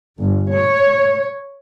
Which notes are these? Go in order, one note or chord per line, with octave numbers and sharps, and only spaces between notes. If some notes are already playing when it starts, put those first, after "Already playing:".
G1
C#5